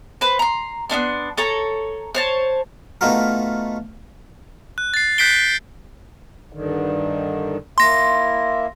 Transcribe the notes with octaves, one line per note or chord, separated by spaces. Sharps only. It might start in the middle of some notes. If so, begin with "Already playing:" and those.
B4 C5
A#5 C6
B3 C#4 D4 C6
A4 C#5 A#5
C5 C#5 A5
A3 B3 D#4 F4 F#4 A#4
F#6
A6 C7
F#6 G6 B6 C7 D7 G7
G2 D3 D#3
A#3 E4 C6 A#6